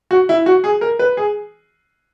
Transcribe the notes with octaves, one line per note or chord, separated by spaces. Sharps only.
F#4
E4
F#4
G#4
A#4
B4
G#4